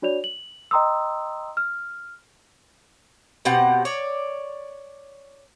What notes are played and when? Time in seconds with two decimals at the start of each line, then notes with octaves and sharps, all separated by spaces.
0.02 D4 F#4 C#5 D5 F7
0.24 F#7
0.71 D#5 G5 A#5 C6 D#6 E6
1.57 F6
3.45 B2 C4 G4 F#5
3.85 C#5 D5